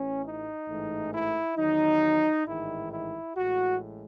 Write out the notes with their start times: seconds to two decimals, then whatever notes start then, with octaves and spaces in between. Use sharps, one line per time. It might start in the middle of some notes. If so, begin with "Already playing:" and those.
Already playing: A1 A2 E3 C#4
0.23 D#4
0.67 A1 G#2 E3 A3
1.13 E4
1.56 E2 D#3 F#3 D#4
2.46 A1 G#2 D#3 G#3 E4
2.90 E4
3.35 A1 A2 G#3 F#4